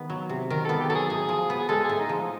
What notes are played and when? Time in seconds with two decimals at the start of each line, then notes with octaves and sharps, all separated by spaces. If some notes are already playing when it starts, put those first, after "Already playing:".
Already playing: D#3 B3
0.10 F#3
0.29 C3
0.50 D#3 A#4
0.65 B3 A4
0.80 G4
0.90 F#3 A4
0.95 G#4
1.09 A2 G#4
1.29 F3
1.50 B3
1.59 G#4
1.69 G#3 A4
1.84 G#4
1.89 A2
1.99 D#4
2.09 F3